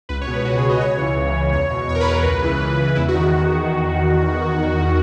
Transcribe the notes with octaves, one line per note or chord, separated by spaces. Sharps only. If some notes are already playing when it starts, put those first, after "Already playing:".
C#2 B4
C#5
B2
B4
C#2 F#4
G#4
B2
D#5
C#2 C#5
C#3 E3
C#2
C#3 E3
E2 C#5
B2
E2 C#5
A#4
B4
B2
B4
C#2
C#3 E3
C#2
C#3 E3
E2 E4
F#4
D#3